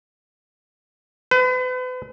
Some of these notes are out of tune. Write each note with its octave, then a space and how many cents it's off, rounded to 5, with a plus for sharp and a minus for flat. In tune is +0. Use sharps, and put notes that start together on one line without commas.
B4 +40